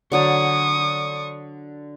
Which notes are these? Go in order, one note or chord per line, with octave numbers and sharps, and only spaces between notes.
D3 F#3 C#5 C#6 D#6